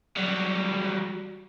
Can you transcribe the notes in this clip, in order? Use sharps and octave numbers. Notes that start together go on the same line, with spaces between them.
F#3 G3